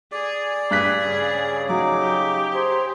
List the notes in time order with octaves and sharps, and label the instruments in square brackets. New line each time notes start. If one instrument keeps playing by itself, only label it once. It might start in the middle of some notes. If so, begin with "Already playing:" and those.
[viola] G#4 [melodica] D5
[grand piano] G2 F#6 B6 [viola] G#4
[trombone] C#3
[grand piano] F#3 [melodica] D#4 D6
[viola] G4
[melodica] G#4 [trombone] C5